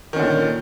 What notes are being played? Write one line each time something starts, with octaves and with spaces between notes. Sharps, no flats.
A#2 D3 D#3 C#4